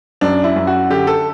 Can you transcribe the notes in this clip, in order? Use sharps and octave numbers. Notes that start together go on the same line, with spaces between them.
F#2 D4
E4
F#2
F#4
D3 G4
A4